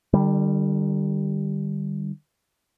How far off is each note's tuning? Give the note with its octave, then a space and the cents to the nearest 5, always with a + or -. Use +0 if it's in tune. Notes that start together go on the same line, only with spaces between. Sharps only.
D3 +45 G3 +0